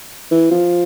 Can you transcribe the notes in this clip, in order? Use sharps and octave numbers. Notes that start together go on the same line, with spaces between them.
E3
F3